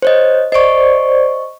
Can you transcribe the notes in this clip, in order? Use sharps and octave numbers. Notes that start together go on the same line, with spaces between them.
C5 C#5 D#5
C5 D5 D#5 C#6